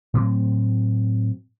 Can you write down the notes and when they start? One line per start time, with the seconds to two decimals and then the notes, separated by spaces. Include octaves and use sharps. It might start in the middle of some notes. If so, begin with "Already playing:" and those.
0.14 A2 F#3 C4